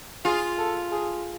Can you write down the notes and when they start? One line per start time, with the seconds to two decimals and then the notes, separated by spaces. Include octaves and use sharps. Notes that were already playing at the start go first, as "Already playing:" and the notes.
0.25 F4 G#4
0.58 A4
0.91 G#4